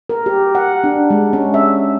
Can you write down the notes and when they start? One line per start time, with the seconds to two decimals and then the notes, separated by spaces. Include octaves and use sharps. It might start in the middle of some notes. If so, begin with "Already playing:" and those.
0.09 A#4
0.26 G4
0.55 F#5
0.84 D4
1.10 G#3
1.33 C#4
1.54 E5